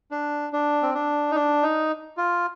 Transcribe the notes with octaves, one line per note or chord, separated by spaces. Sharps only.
D4
D4
C4
D4
D#4
D4
D#4
F4